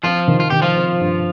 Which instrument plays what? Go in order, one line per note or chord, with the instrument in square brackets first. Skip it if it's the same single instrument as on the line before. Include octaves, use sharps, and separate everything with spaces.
[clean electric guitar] F3 F4 [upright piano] C4
[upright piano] D#3
[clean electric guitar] F4
[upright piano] D#3 [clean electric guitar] G4
[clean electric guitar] F3 F4
[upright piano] C4
G2